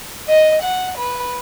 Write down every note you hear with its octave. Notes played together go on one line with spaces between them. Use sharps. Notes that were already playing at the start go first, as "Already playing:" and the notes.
D#5
F#5
B4